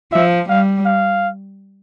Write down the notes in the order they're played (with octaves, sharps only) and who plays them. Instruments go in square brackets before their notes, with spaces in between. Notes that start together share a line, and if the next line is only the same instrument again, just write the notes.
[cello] F3 [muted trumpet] E5
[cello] G3 [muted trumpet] F5
[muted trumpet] F5